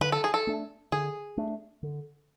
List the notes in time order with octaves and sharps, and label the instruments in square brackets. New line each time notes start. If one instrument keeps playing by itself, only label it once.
[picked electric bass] D3 [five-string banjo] B4
[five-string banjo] A4
G#4
A4
[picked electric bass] A3 D4
[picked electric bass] D3 [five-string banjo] G#4
[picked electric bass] A3 D4
D3